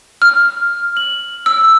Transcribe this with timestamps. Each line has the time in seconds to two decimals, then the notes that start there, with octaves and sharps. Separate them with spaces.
0.22 F6
0.97 F#7
1.46 E6